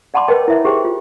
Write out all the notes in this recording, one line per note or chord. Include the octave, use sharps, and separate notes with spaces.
D5 F#5 A5 B5 C6 D6
A#4 B4 C#5 D#5 G5 A5
E4 C#5 E5
D#4 G4 G#4 C5 G5
F4